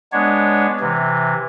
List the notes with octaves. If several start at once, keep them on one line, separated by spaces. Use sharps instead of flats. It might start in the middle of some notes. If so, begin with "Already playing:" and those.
G#3 B3 D4 C#5
C3 E3